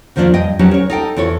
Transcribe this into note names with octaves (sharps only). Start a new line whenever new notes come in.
D#2 D#3 F3 A#3 D4
G2 D#5 G5
F#3 C#4 D#4 G4 B4
A#4 C#5
D#4 A4 G5
E2 E4 A4 C#5